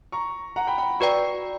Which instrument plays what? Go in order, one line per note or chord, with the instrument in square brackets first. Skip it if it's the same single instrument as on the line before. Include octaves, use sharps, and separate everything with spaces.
[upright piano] A#5 C#6
F#5 A#5
G5 B5
G5 B5
[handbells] F#4 B4 D5 G5 [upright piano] A#5 C#6